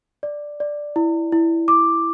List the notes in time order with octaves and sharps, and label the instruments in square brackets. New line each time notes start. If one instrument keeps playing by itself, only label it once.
[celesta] D5
D5
E4
E4
D6